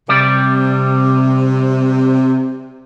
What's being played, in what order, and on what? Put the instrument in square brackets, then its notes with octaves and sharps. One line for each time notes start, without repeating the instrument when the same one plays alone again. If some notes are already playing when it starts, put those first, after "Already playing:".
[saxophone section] C3 [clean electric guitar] G3 D5